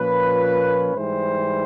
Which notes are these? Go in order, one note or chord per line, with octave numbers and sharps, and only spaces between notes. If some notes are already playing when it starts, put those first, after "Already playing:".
Already playing: A#2 F3 A#3 C#4 B4
G#2 E3 G3 C5